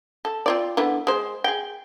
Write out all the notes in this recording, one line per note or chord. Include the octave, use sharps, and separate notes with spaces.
A4
C4 F4 D5
D3 E3 B3
G#3 C5
G#4 G5